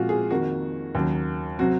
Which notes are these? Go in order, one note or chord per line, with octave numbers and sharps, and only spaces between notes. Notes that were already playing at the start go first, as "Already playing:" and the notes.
Already playing: A#2 F3 G#3 C4 F4 F#4
G#4
F2 D#3 A#3 F#4
D#2 C#3 F#3
C3 F#3 C4 F#4